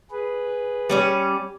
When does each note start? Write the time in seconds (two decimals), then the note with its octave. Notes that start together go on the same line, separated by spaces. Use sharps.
0.11 G#4 B4
0.89 G3 C#4 D5